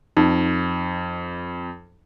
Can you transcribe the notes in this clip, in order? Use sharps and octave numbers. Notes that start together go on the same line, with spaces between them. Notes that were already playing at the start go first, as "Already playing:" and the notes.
F2 D#4